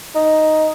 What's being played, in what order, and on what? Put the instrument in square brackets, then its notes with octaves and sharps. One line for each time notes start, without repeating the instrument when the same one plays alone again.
[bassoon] D#4